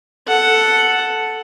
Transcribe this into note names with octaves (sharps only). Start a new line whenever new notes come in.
A4 F#5